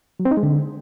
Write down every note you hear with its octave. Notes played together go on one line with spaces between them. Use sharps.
F#3
C4
D#4
G#3
D3